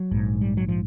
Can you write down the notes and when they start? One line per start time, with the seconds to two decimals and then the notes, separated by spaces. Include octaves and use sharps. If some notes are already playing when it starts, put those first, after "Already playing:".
Already playing: F#3
0.11 A#1 G#2
0.41 G3
0.57 F#3
0.69 F3